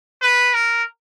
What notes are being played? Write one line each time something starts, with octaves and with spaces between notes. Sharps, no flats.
B4
A#4